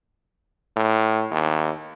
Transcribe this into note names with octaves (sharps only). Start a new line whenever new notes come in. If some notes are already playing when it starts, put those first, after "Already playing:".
A2
D#2